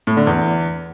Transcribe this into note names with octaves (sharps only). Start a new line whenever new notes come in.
A2
D3
E2